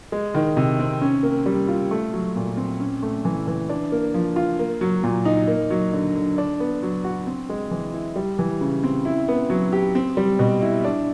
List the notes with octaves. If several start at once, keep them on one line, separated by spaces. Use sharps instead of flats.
G#3
D#3
C3
C4
C#4
A#3
G3
F4
A3
F#3
A#2
C4
C#4
A3
E3
E3
D4
A#3
F3
F4
A#3
F#3
A#2
D#4
A#3
F#3
D3
D3
D4
B3
F#3
F#4
C4
G#3
E3
E4
G3
E3
C#3
C4
E4
B3
F#3
G4
C4
G3
B2
E4
D4